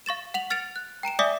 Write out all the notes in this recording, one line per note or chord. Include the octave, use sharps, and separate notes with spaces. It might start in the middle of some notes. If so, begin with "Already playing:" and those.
F5 C#6 A6 E7
F#5 F7 F#7
F6 A6 C#7 D7 F7
F#6
G5 A#5 D7 E7
D5 E5 G#5 D6 D#6 B6